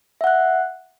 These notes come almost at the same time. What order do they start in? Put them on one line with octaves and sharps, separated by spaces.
E5 F#5 F#6